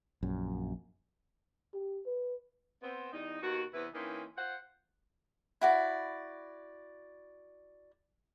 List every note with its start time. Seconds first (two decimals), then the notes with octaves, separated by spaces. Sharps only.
0.23 A#1 F#2
1.74 G4
2.06 B4
2.83 B3 C4
3.13 E2 G3 D#4
3.42 D#2 B2 F#4
3.74 E2 C3 E4 B4
3.94 E3 A#3 C4 C#4 D#4
4.37 F4 C5 F#5
5.61 E4 F#4 D5